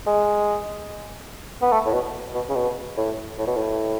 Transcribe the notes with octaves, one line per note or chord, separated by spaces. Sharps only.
G#3
B3
A3
A2
B2
B2
C#3
B2
A2
A2
B2
A2